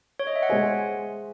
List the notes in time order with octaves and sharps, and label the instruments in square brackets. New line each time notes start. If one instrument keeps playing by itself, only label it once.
[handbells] C#5
D#5
E5
F#5
[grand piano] G#3 G#4 C5 [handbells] G#5